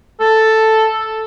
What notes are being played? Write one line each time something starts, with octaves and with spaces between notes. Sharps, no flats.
A4